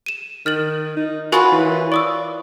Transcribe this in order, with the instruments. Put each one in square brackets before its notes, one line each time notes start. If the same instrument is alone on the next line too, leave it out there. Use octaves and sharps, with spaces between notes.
[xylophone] D#7 E7
[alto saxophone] D#3 [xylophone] F6 A6 F#7
[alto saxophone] D#4
[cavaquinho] F4 B4 C#5 [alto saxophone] F#4 [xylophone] A#4 G#5 C#6
[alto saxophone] E3
[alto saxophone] D5 [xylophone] C#6 D#6 E6